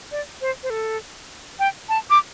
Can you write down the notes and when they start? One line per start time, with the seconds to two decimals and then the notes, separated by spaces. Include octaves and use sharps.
0.12 D5
0.41 C5
0.63 C5
0.70 A4
1.59 G5
1.89 A5
2.10 D6